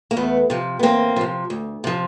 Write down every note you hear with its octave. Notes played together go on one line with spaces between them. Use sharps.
A#3
E2 A3 B3
C3 F3
B3
E2 A#3 C4
C3 F3
D2
C3 F3